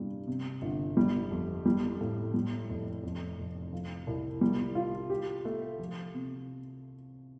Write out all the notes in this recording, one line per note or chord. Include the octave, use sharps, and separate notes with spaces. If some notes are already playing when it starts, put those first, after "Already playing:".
Already playing: G2 C3 G3
C3
G1
G3
F2
G3
A2
G3
F1
F2
F1
F3
C2
G3
F4
G4
A3
F3
C3